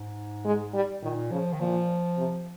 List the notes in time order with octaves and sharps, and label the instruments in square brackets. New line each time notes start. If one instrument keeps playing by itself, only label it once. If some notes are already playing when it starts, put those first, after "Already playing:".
Already playing: [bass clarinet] G#2
[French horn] G#3
G3
[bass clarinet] A#2 [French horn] D#3
[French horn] C#3 [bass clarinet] F3
[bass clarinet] D#3
[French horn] A#2 [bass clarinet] F3
[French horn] C3